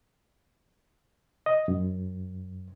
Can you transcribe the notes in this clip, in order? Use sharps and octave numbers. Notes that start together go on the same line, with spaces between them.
D#5
F#2